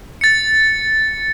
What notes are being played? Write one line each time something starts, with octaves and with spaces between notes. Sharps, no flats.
A6 C#7